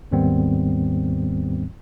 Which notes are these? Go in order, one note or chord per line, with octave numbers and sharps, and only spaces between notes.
D#2 G#2 D#3 G3 B3 C4